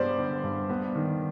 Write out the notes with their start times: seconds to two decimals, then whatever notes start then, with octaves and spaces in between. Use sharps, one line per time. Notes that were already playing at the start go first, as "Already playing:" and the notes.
Already playing: G2 G3 B3 C5 D5
0.19 D3
0.44 G2
0.70 B3
0.95 D#3